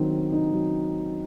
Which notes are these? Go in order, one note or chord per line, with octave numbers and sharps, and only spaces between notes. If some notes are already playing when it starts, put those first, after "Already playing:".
Already playing: D#3 F#3 C4 D#4
C4
D#4
F#3